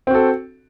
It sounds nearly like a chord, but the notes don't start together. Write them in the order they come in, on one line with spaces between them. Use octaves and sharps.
C4 F#4 A4